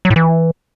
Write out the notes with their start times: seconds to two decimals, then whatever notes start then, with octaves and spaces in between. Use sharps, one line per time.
0.05 F#3
0.10 A2
0.16 E3